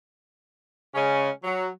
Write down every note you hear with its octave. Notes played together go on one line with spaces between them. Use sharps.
C#3 G#3 C#4
F#3